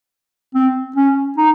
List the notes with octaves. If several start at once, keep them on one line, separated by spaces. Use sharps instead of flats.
C4
C#4
D#4